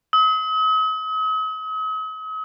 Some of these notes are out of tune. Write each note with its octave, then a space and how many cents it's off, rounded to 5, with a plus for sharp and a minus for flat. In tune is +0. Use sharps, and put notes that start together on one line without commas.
D#6 +45